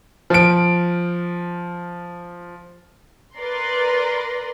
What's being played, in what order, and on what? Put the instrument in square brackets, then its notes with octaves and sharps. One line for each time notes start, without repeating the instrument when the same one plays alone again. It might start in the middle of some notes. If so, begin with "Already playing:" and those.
[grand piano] F3 D7
[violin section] A#4 B4 D5 A#5 C6